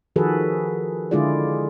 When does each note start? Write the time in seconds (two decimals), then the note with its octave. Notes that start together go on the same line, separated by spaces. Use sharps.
0.16 D#3 F3 F#4 G#4 A4 B4
1.11 D3 G#3 E4 F4 G#4 D5